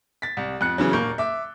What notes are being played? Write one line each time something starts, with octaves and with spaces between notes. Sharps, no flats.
A6 B6
C2
F2 F#6 C#7
C#3 E3 F#3
D#1 A#3 C#6 G6
E5 D6